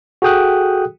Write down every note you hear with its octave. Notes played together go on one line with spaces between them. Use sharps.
F#4 G#4 A4 G5 D#6 F#6